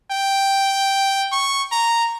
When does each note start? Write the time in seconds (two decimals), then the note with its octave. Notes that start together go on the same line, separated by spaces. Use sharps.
0.12 G5
1.32 C#6
1.72 A#5